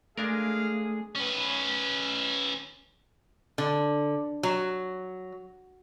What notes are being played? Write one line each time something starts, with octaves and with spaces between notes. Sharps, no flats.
G#3 A3 D4 G#4 A#4 F5
C#4 B4
D3
F#3